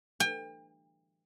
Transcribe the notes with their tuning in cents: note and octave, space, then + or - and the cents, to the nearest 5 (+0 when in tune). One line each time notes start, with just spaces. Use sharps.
G5 +35